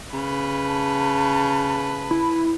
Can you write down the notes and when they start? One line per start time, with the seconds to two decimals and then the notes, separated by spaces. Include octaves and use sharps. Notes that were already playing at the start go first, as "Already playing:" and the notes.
0.14 C#3 B4
0.66 A5
2.11 E4